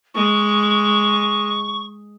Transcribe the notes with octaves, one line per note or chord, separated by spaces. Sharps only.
G#3 C#6